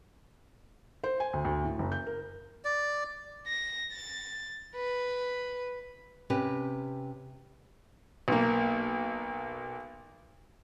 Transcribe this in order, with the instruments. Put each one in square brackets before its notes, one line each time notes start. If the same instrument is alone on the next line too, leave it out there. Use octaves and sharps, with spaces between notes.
[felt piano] C5
G#5
D2
D2
A2
F#1
G6
A#4
[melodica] D5
[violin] A#6
A6
B4
[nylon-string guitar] C3 C#4 G4 B4
[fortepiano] B1 A#3